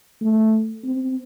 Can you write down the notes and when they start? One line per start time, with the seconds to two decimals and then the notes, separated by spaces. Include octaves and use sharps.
0.21 A3
0.84 C4